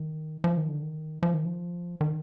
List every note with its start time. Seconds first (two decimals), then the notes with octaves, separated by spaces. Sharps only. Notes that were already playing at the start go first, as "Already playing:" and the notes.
Already playing: D#3
0.44 F3
0.57 D#3
0.69 D3
0.82 D#3
1.23 F3
1.34 D#3
1.45 F3
2.01 D#3